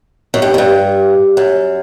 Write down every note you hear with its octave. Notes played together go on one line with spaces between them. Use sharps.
F#2
G2
F#2
G2
F#2